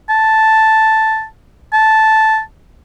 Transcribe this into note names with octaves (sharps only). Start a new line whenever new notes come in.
A5
A5